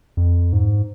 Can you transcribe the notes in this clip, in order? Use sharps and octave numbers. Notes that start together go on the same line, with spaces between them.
F2
G#2